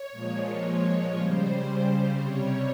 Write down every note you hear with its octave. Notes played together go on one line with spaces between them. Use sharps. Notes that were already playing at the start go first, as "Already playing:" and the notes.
Already playing: C#5
A#2 F3 G#3
C#5
C#3 G3 C5
C3 G3 C#5